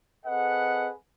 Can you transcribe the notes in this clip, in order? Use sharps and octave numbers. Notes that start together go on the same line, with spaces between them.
C4 G#4 A4 B4 D#5 F#5